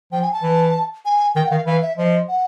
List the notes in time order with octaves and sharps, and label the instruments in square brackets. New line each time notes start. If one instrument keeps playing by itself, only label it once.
[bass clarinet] F3 [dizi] G5
[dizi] G#5
A5
[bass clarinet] E3
[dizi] G#5
[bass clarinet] D#3 [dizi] G5
[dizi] F#5
[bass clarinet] D#3 [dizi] F5
[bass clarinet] E3 [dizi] F5
[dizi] E5
[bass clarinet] F3 [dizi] D#5
[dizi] F#5